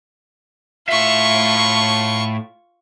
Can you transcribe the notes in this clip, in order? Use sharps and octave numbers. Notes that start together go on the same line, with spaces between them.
A2 F4 E5 C#6